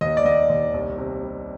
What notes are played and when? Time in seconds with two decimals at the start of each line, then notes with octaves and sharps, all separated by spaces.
0.01 D#2 D#5
0.17 D5
0.25 D#2 D#5
0.50 D#2
0.74 C2
0.98 C3
1.23 G3